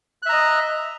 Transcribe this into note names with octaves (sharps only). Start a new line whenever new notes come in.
D#5 E5 A#5 F#6